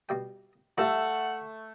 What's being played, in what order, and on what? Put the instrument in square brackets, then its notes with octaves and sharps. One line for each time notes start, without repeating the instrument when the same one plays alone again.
[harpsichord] B2 G3 G5
[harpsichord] A2 F3 G3 [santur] A3 E6 [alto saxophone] F#5